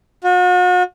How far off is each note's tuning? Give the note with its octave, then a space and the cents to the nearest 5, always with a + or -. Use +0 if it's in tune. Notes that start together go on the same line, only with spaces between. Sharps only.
F#4 -40